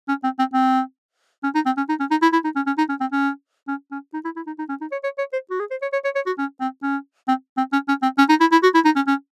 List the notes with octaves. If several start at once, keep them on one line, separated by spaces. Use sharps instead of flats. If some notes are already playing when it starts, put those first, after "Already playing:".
C#4
C4
C4
C4
C#4
D#4
C4
C#4
D#4
C#4
D#4
E4
E4
D#4
C#4
C#4
D#4
C#4
C4
C#4
C#4
C#4
D#4
E4
E4
D#4
D#4
C#4
D#4
C#5
C#5
C#5
C5
F#4
G#4
C5
C#5
C#5
C#5
C#5
F#4
C#4
C4
C#4
C4
C4
C#4
C#4
C4
C#4
D#4
E4
E4
F#4
E4
D#4
C#4
C#4